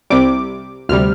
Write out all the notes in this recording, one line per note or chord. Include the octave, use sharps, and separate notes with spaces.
C2 C3 G3 D6
D2 C3 G3 F6